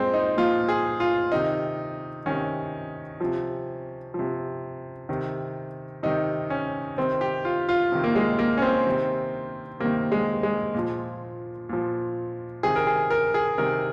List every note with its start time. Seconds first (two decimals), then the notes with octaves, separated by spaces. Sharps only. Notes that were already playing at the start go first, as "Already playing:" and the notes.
Already playing: A#2 F3 G#3 C4
0.14 D#4
0.37 A#2 F3 F4
0.69 G#4
1.00 F4
1.32 C3 D#3 D#4
2.26 C3 D#3 C#4
3.21 C3 F3
4.14 C3 F3
5.09 C3 D#3
6.03 C3 D#3 D#4
6.50 C#4
6.97 C3 D#3 C4
7.21 G4
7.45 F4
7.69 F4
7.92 C3 D#3
8.04 A#3
8.16 G#3
8.39 A#3
8.58 C#4
8.62 C4
8.87 C3 D#3
9.80 C3 D#3 A#3
10.12 G#3
10.43 G#3
10.75 A#2 F3
11.69 A#2 F3
12.63 C3 D#3 G#4
12.76 A#4
12.87 G#4
13.10 A#4
13.34 G#4
13.58 C3 D#3 A#4